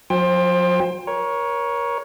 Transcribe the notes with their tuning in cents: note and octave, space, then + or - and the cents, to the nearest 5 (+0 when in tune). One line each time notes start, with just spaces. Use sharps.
F#3 -45 C5 +15 G5 +30
A#4 +30 C#5 +0